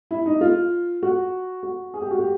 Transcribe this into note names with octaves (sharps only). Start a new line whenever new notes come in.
E4
D#4
F4
F#4
F#4
G#4
G4
F#4
G4